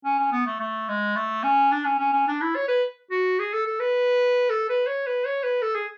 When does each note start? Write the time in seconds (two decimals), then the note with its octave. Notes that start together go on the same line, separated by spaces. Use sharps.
0.04 C#4
0.18 C#4
0.32 B3
0.47 A3
0.60 A3
0.88 G#3
1.16 A3
1.44 C#4
1.72 D4
1.85 C#4
1.99 C#4
2.13 C#4
2.28 D4
2.41 E4
2.56 C#5
2.68 B4
3.11 F#4
3.39 G#4
3.53 A4
3.66 A4
3.80 B4
4.50 A4
4.69 B4
4.87 C#5
5.07 B4
5.25 C#5
5.43 B4
5.62 A4
5.75 G#4